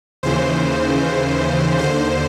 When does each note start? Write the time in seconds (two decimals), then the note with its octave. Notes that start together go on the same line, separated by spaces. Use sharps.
0.23 D#2 C#3 E3 C5
1.78 D#2 D3 C5